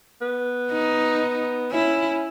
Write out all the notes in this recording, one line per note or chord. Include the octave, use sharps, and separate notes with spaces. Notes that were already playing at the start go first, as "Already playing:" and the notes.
B3
D#4
C#4 E4